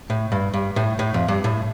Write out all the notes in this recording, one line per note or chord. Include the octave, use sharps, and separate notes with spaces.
A2
G2
G2
A2
A2
F2
G2
A2